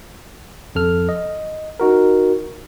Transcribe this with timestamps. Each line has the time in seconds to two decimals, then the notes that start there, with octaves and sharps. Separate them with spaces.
0.75 F2 A4 F6
1.09 D#5
1.80 D#4 F#4 A#4